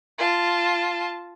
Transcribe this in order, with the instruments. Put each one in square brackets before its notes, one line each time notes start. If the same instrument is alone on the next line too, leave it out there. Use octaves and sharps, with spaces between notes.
[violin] F4 A5